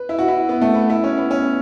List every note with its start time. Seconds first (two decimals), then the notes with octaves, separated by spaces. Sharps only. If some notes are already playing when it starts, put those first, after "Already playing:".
Already playing: B4
0.09 E4
0.19 F#4
0.28 E4
0.49 B3
0.61 A3
0.74 B3
0.90 E4
1.04 C#4
1.17 B3
1.31 C#4